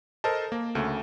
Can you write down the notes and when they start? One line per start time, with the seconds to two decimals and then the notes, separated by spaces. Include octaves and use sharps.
0.24 A4 A#4 C5 D#5 A5
0.52 A#3
0.75 D2 C#3 A3